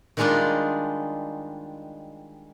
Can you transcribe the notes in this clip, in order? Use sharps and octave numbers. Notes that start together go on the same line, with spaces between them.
D#3 G3 G#3 D4 D#4 F4